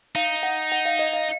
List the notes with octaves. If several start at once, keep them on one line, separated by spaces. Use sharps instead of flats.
D#4 F5
F#5
F#5
F5
D#5
F5